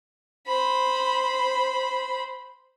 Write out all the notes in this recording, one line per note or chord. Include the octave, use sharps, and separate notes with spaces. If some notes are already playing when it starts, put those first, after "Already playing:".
C5 B5